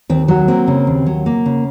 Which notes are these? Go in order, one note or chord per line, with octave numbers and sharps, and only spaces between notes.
D#2 C4
F#3
A#3 C4
C#3
D#2
F#3
A#3
C#3